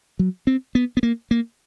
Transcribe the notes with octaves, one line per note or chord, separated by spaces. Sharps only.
F#3
C4
B3
B3
A#3
A#3